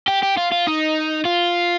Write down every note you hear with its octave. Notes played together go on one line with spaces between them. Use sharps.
G4
G4
F4
F4
D#4
F4